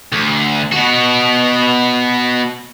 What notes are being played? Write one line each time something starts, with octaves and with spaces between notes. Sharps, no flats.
D2
B2 F#4